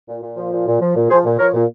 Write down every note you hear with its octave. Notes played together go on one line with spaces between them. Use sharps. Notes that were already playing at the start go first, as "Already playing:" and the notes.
A#2
A#2
F3
A#2
A#2
F3
A#2
F3 G#4 C5
A#2
F3 A#4 C#5
A#2